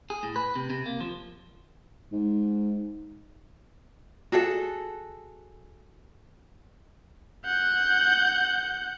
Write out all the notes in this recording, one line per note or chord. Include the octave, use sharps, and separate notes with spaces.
G#4
A2
B4
C3
C3
A#3
F3
G#2
F#4 G#4 A4 F#5
F#5 G6